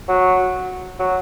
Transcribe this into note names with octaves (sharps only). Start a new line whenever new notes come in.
F#3
F#3